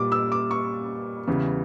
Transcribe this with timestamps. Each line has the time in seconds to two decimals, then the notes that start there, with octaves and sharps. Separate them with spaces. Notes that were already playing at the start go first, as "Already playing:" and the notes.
Already playing: A#2 G3 D6
0.12 E6
0.32 D6
0.51 C#6
1.27 E2 C#3 E3 G3